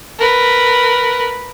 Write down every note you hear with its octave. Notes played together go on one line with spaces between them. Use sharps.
A#4 B4